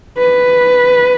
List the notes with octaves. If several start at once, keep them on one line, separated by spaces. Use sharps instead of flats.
B4